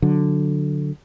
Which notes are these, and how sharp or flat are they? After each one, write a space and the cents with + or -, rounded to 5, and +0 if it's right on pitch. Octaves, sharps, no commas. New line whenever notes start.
D3 +0 F#3 -15